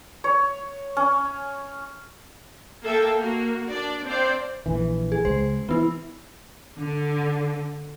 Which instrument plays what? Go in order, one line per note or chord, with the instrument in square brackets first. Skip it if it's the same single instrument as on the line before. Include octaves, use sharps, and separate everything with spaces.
[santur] C#5
C#4
[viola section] A#3 A4 E5 G5 A5
A#3 F#4
D4 D5
C4 D4 C5 D5 F5 G5
[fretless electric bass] A#1 E3
[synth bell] G#4
[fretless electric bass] C#2 [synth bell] C5
[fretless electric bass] E3 [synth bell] B3 E4
[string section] D3